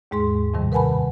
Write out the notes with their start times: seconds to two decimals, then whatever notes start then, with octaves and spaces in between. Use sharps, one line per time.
0.11 D#2 G#2 G#3 G#4 C6
0.54 F2 A2 C3 D#3 G3
0.72 A#4 B4 F#5 G#5 A5 B5